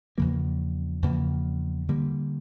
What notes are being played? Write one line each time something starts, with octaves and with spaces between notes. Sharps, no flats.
E2 C#3 F3 A#3
E2 C#3 F3 A#3
D3 G3 A#3